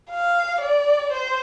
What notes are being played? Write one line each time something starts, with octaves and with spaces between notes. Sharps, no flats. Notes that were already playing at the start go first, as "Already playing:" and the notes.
F5
D5
C5